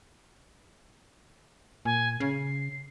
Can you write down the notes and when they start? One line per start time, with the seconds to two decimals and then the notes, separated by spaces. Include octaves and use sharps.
1.85 A#2 G#5
2.20 C#3 C7